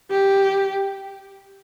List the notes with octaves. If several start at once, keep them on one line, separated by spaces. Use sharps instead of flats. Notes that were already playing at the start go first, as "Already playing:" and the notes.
G4